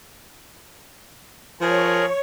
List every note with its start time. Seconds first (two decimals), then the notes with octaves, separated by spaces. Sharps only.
1.61 F3 G#4 A#4 C#5